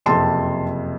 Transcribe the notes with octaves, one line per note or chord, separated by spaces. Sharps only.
F#1 F2 C3 A5 C6